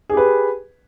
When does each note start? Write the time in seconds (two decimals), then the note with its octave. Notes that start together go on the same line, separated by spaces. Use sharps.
0.10 G#4
0.13 G4
0.17 B4